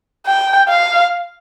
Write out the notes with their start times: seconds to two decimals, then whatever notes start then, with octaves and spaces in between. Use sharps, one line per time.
0.26 G5
0.69 F5